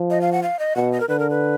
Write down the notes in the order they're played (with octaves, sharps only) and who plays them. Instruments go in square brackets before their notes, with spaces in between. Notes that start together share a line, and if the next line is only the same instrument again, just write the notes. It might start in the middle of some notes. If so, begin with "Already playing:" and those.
Already playing: [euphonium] F3
[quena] D#5
F5
F#5
F5
D#5
[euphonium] B2 [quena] F#5
[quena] D#5
A#4
[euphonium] D3 [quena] B4
[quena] A#4
B4